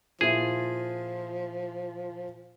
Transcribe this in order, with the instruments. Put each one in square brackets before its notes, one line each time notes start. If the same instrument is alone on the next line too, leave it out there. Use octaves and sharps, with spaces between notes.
[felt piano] A#2 E4 F4 [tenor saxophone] F3 [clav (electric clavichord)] G#4